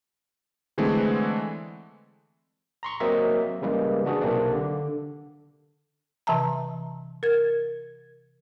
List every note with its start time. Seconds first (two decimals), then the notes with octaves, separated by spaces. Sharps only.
0.78 D3 E3 G#3 A3 C4
2.83 A#5 C6 C#6
3.00 F#3 A#3 C4 A#4 D#5 E5
3.62 C#3 E3 G3 G#3 A#3
4.05 B3 D4 F#4 G#4
4.21 B1 C3 A#3 C4 D4
4.52 D3
6.27 C3 E3 E5 A5 A#5
7.23 A#4 G#6